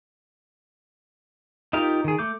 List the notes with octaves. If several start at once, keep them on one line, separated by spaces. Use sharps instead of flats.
D#4 F4 G4 A#4 F5
D#3 G#4
A3 D6 G6